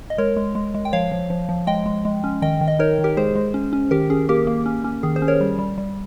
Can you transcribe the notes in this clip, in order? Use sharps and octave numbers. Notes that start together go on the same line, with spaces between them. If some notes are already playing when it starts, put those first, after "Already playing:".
D#5
G#3 A#4 C#5
G#3
G#3
G#3
G5
F3 C#5 F5
F3
F3
F3
G#3 D#5 G5
G#3
G#3
C#4
D#3 D#5 G5
D#3
D#5
D#4 A#4 C#5
D#3
G4 A#4
G#3 G#4 C5
G#3
C#4
C#4
D#3 G4 A#4
C#4 G#4
A#3 G4 A#4
A#3
C#4
C#4
D#3 G#4
G#4 C5
C#4
A#4 C#5
G3
G3
G3